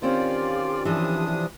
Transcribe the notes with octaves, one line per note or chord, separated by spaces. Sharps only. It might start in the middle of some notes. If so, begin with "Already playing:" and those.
D#3 C4 C#4 F4 G4 D5
C3 E3 F3 D4 D#6